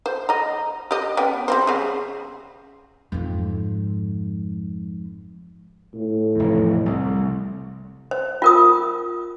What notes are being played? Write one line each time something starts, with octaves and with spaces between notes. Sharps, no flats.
C5
D#5 A#5
G4 D#5
B3 C#4 G5
G3 C4 C5
C#3 G#4
F2 G#2
A2
F1 E2
C2
C5
F4 A#4 D#6